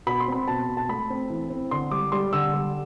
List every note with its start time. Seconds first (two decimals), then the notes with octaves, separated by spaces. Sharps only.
0.07 B2 B5
0.20 C6
0.28 C4 B5
0.48 B2 A5
0.68 B2
0.77 A5
0.89 A3 B5
1.10 C4
1.30 E3
1.50 C4
1.71 D3 C6
1.91 G3 D6
2.12 G3 C6
2.33 D3 E6
2.54 G3